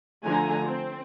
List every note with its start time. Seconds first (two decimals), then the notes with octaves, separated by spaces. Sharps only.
0.24 D3 F3 A3 G#5 A#5
0.67 C4